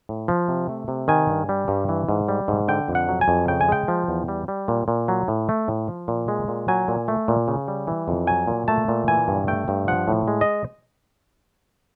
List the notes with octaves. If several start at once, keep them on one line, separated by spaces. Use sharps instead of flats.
A2
F3
C3
A3
C3
D#3 G#5
G2
G3
G2
E3
G#2
G3
G#2
D3 G5
F2
F#5
F#3
G#5
F2
C#3 G5
G#5
G#3 G5
F3
E2
G3
G3
A#2
A#2
F#3
A2
A3
A2
F3
A#2
G#3
A#2
F#3 G#5
A#2
A3
A#2
C#3
G3
E3
F2
F#3 G#5
A#2
A3 A5
A#2
E3 G#5
G2
A3 G5
G2
F3 F#5
A2
G#3
D#5